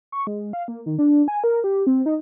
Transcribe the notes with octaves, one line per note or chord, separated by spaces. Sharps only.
C#6
G#3
F5
A#3
D#3
D4
G#5
A#4
G4
C4
D#4